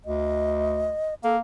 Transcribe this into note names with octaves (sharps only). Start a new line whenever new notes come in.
D2 D#5
A#3 A4